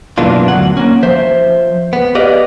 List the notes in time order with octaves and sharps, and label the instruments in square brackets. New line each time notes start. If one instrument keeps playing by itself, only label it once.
[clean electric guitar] F#2 B2 E3 A#3 D4 F4
D2 F#3 F#5
A#3 C#4
F3 C5 E5
B3
G4 B4 D5 D#5 F5